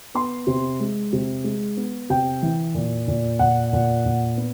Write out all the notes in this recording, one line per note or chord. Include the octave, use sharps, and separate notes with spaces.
B3 C6
C3
G#3
C3
G#3
B3
C3 G5
E3
A#2
A#2
A#2 F#5
A#2
A#2
B3